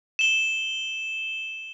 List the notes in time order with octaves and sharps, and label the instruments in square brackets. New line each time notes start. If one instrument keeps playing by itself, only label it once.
[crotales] E7 G7